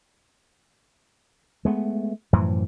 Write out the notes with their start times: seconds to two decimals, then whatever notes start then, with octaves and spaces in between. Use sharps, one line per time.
1.65 G#3 A3 B3
2.33 F#2 A2 E3 F3